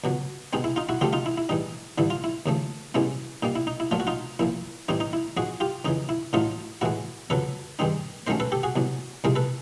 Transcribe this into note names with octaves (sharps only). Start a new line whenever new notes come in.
C#2 B2 F#3
B2 G#3 C4 D#4
E4
D#4 F4
E4 F#4
D2 C3 F3 A3 F4 G4
D#4 F4
E4
E4
G#2 E3 G3 D#4
A1 G2 D3 E4
F4
E4
D#2 C#3 F3 A3
C2 B2 G#3 C#4 E4
A#2 G3 A#3 D#4
E4
D#4
E4
A#1 A#2 F#3 A3 F4
F#4
D#4 F4
A#1 A#2 F3 E4
A2 E3 G3 C4 D#4
D#4
E4
G#2 F3 G#3 F#4 G#4
F4 G4
F2 C#3 E3 D#4
E4
A1 A2 F#3 A3 D#4 F4
A2 E3 G#3 E4 F#4
F2 C#3 F#3 A4 B4
G2 D#3 G#3 C4 D#4
D#2 D#3 F#3 A3 C#4 A#4 C5
A4 B4
G4 A4
F#4 G#4
C2 B2 F#3
C2 C3 F3 G#3 G#4 A#4
A4 B4